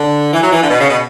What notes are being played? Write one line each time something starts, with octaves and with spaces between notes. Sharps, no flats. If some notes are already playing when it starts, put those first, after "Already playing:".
Already playing: D3
E3
F#3
E3
D3
B2
C#3
B2